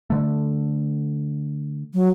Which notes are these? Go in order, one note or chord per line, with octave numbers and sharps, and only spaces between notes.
D3 A3
F#3